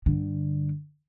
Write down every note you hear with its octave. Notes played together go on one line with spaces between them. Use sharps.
G2 D3